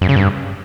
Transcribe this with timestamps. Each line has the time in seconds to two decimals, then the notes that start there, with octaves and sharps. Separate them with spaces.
0.01 F#2
0.09 C#3
0.16 G2